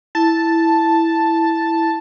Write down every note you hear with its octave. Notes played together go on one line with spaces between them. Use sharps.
E4 A5